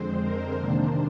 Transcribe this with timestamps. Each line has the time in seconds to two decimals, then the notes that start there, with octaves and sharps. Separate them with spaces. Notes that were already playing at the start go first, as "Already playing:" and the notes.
Already playing: F2 D3 G#3 C4 C5
0.21 A#4
0.58 C3 D#3 A#3 D4 C5